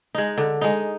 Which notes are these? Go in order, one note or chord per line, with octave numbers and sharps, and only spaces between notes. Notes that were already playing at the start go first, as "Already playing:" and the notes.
G#3 D#4
D3
G#3 D#4